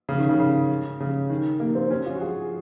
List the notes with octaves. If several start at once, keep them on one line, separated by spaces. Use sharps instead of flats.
C#3
D#3
C#3
C#3
C#3
D#3
A#3
C4
C#4
F4
F#4
G#4